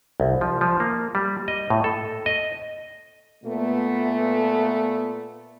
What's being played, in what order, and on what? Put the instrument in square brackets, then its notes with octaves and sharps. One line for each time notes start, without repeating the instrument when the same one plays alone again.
[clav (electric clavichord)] C2
F3
F3
A#3
G3
D#5
A2
A4
D#5
[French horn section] A#2 A3 B3